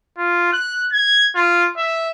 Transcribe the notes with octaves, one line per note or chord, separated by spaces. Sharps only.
F4
F#6
G#6
F4
E5